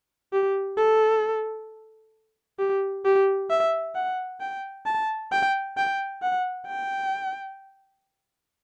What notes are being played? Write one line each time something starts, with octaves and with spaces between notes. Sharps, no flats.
G4
A4
G4
G4
E5
F#5
G5
A5
G5
G5
F#5
G5